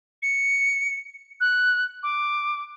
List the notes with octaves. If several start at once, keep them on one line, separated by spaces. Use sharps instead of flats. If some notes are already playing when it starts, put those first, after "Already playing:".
C#7
F#6
D6